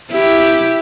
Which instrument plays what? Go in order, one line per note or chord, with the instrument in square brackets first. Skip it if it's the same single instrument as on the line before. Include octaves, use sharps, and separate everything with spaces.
[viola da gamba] E4 G4